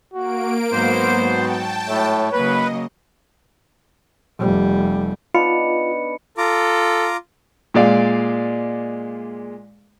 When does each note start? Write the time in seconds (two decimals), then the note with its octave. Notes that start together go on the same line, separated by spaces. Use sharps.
0.14 A#3 F#4 D7
0.72 G#2 F#3 B3 F#4 C5
1.20 G5 A5
1.87 A2 A3 C#5
2.33 C#3 F#3 A#3 B4 D#5
4.39 F1 G3
5.34 B3 D4 D#4 F4 B5 C#7
6.38 F4 A4 A#5 D6
7.74 A#2 G#3 D5 F5